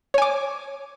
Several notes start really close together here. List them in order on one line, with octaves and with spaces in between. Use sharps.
C#5 G#5 D6